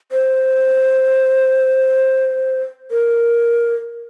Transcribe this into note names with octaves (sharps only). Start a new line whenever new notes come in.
C5
A#4